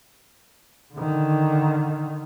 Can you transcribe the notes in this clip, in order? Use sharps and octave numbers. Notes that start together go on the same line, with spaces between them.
D3 D#3